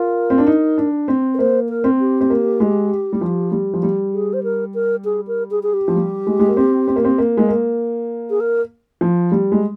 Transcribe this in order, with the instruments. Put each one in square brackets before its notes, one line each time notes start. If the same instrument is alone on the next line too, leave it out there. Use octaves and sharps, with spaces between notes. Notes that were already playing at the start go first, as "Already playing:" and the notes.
Already playing: [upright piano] F4 [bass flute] A#4
[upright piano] C4
D4
D#4
D4
C4
[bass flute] A#4
[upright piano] A#3 [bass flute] C5
[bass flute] A#4
[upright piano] C4
[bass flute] G4
[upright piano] C4
A#3
G#3
G3
F3
G3
F3
G3
[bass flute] G#4
C5
A#4
A#4
G#4
A#4
G#4
G#4
G4
[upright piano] F3
G3
G#3
G#3
A#3
C4
C4
A#3
C4
A#3
G#3
A#3
[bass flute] G#4
A#4
[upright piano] F3
G3
G#3